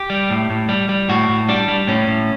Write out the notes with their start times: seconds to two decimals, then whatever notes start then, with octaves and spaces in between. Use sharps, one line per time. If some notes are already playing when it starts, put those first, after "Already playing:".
Already playing: G4
0.10 G3
0.30 A2
0.50 A2
0.69 G3
0.89 G3
1.09 A2 F#4
1.29 A2
1.49 G3 D4
1.68 G3
1.87 A2 C#4
2.07 A2